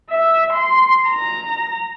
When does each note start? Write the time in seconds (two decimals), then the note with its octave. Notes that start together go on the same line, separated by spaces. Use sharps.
0.10 E5
0.53 C6
1.07 A#5